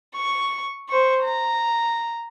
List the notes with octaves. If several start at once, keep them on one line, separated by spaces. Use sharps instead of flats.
C#6
C5 C#6
A#5